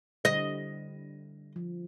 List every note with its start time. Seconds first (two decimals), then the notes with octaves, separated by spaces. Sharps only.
0.25 D3 G3 D#5
1.56 F3